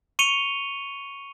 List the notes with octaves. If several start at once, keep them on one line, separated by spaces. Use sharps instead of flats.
C#6 C#7 D#7 F7 G7